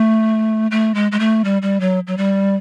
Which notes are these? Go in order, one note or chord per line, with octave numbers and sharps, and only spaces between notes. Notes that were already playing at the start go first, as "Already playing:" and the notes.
Already playing: A3
A3
G#3
G#3
A3
G3
G3
F#3
F#3
G3